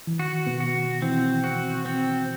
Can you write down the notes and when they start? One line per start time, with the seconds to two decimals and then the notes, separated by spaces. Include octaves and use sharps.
0.07 E3
0.19 D#3 F#4
0.47 B2 B3
0.60 F#4
1.02 E3 C4 E4
1.44 F#4
1.86 C4